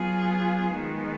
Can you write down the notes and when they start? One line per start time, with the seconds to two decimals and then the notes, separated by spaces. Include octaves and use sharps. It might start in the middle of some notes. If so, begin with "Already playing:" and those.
Already playing: F#3 B3 F4 G#4
0.72 D#3 G#3 B3